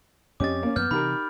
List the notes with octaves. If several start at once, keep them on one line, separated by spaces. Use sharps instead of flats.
F2 C4 C#4 G4 D#5 D6 A6
A#3 C#4
F#2 F#3 B3 F6 G6
C3 E3 D#4 G4 A#4 B5